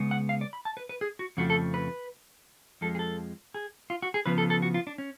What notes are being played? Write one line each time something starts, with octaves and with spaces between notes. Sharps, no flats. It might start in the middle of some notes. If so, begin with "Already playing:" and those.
Already playing: C#3 G#3 B3
F#5
F5
D5
B5
A5
B4
B4
G#4
F#4
F2 C#3 F3 A3 F#4
A4
B4
F2 F3 G#3 A4
G#4
A4
G#4
F4
F#4
G#4
C#3 F3 B3 B4
A4
A4
F#4
F4
D4
C#4